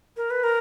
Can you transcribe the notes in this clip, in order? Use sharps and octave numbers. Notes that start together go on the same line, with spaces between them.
A#4
B4
A#4